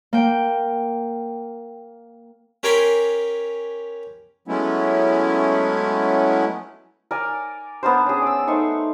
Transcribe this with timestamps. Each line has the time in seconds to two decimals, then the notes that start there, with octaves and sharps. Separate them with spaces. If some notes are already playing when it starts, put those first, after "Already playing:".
0.13 A#3 G5
2.63 C#4 G4 A#4 G#5 B5 C6
4.48 F#3 G#3 A3 B3 C#4 E4
7.11 A#4 D5 G#5
7.83 B3 D4 A#4 C5
8.06 C#4 G#4
8.22 D5 E6
8.48 A3 D#4 C5 C#6